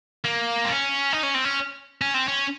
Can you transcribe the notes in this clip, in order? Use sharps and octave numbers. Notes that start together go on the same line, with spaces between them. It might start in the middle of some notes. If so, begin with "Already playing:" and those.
A#3
C4
C#4
D#4
C#4
C4
C#4
C#4
C4
C#4